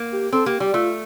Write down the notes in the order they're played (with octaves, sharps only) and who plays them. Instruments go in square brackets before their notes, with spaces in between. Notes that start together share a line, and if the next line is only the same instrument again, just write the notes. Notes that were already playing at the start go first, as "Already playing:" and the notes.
Already playing: [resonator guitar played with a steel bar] A#3
[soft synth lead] G4
[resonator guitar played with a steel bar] C4 [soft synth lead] A4
[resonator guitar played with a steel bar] A#3 [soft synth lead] G4
[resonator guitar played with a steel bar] G3 [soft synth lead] G4
[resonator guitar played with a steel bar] A3 [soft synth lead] F4